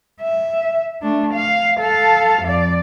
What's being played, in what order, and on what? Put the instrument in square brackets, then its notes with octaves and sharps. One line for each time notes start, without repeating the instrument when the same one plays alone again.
[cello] E5
A3 D4
F5
A4 F5
F2 D5